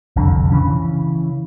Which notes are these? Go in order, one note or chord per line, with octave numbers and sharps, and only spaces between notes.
F#1 C2 F2 D3
C#3 E3 C#4